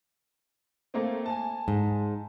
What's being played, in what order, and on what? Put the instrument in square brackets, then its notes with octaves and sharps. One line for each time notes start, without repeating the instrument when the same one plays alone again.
[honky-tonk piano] A3 A#3 C4
G#5 A5
[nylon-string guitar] G#2